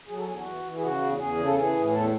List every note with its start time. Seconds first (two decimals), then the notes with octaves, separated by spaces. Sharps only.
0.08 F#3 G#4
0.18 A4
0.27 E2 G#4
0.36 F#4
0.45 E3
0.64 E3
0.78 G#4
0.82 C#3 F#4
1.01 E2
1.19 E2 G#4
1.38 C#3
1.45 A4
1.56 E3 G#4
1.74 A2
1.93 E2 A4